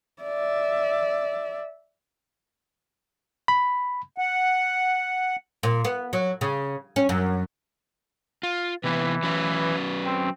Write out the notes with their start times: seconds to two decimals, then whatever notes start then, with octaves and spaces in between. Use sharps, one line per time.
0.23 D5 E5
3.48 B5
4.18 F#5
5.63 A#2
5.85 B3
6.13 F#3
6.41 C#3
6.96 C#4
7.09 F#2
8.43 F4
8.84 C3 E3 B3 E4
9.23 F#3 C#4 B4
10.05 C4